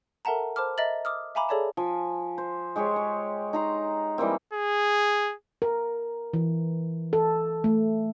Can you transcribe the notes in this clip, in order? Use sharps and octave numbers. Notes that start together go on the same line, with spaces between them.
A4 A#4 E5 F#5 A5 A#5
C5 A5 B5 D6 F6
D#5 E5 A#5 A6 F#7
D6 D#6 F6
E5 F5 G#5 A#5 B5 D6
G#4 A4 C#5 D5 E5 A5
F3 G#5
C5
G#3 G4 G#4 C#5
C#5
D#4 A#5 C6
E3 G3 A#3 C4
G#4
A#4
E3
A4
A3